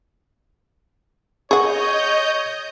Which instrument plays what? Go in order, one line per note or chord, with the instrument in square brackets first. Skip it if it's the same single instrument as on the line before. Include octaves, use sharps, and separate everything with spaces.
[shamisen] G#4 F#5 [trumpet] C#5 [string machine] D#5 G6 [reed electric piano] C#6